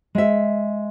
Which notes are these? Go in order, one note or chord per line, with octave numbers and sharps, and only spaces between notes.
G#3 E5